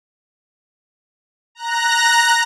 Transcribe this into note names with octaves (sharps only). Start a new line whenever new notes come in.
A#5 F#6 A#6